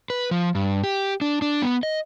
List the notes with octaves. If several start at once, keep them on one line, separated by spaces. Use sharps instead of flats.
B4
F3
G2
G4
D4
D4
B3
D#5